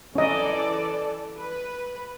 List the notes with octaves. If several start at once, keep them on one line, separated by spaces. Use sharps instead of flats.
E3 C#4 A4 D5 D#5
B4